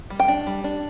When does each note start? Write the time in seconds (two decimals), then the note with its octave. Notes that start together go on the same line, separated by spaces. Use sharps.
0.10 G3
0.20 G5
0.28 D4
0.46 G3
0.64 D4